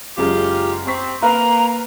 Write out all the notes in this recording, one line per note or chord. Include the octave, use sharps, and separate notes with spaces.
F#1 F#2 G#3 F4 G4
C4 A#5 C#6 B6
A#3 B4 F5 A#5 F#6